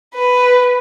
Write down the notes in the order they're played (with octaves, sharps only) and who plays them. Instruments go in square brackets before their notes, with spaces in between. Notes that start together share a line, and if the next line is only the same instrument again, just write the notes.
[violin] B4